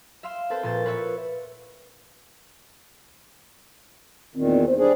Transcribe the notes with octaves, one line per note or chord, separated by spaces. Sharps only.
E5 F5 C6 F6 E7
C4 A4 B4 C5
A#1 A#2 C5 A6
F4 B4 C#5 E5
E2 A#2 D#3 C4
C5
G3 D4 G#4 C5